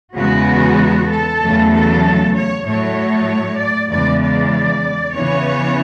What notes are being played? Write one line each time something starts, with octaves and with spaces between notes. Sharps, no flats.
E2 C#3 G#3 B3 F#4
A4
E2 C#3 F#3 A3
A4
C#5
A2 F#3 A3 C#5
D5
E2 C#3 G#3 D5
D5
C#3 E3 B3 C#5